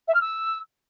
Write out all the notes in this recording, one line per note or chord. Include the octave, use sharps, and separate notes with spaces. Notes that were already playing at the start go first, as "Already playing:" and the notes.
E5
F6
E6